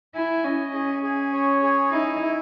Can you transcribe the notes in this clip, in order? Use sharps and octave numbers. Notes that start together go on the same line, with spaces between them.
E4 G#5
C#4 D#5
C#4 G#4
G#4
C#5
G#4
D#4 E4
E4